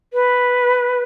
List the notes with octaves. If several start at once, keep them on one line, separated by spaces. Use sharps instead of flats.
B4